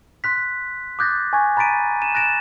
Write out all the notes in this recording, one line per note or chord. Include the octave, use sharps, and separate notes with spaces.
C6 F#6 B6
D6 D#6 F#6 G6 A6 A#6
G#5 C#6 G#6
A#5 B5 A6 B6 D7 D#7
A6 D#7 E7
F#6 A6 A#6 D7 E7